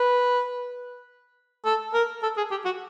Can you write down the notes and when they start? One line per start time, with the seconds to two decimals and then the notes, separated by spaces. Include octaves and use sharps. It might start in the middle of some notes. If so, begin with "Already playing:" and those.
Already playing: B4
1.66 A4
1.94 A#4
2.23 A4
2.37 G#4
2.51 G4
2.65 F#4